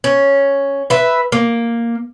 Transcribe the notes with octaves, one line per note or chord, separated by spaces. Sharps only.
C#4
B4 E5
A#3